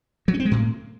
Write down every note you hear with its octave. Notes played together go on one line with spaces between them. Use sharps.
F#3
C#4
C4
G#3
A2